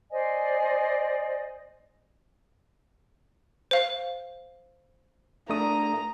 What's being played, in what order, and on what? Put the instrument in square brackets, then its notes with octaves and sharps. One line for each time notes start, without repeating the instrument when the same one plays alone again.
[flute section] C5 D5 D#5 G#5
[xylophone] C5 F5
[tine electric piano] A3 D4 D#6 [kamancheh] A#5